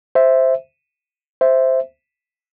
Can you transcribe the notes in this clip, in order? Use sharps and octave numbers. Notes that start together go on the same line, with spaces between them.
C5 E5
C5 E5